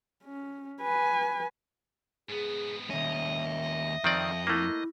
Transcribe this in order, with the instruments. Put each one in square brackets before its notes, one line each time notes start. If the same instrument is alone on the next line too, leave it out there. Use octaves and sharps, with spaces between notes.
[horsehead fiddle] C#4
B4 G#5
[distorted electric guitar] G#2 B3 [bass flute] G#4
[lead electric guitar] D#2 C#4 [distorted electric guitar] D#5 [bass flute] E5
[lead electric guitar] F2 [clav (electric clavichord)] D#3 C4 D5
[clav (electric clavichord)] A3 A#3 [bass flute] E4